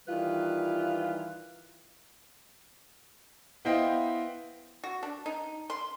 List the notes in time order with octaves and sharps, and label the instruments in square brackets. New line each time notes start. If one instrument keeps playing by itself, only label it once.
[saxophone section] D#3 E3 G3 F4 B4
[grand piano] B3 E4 C5 D#5 F5 G5
[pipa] F#4
D4
D#4
C6